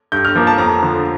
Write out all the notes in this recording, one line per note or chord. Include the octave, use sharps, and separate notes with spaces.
G2 G6
F6
F3 A#3
A5
F2 A#5
D3 F3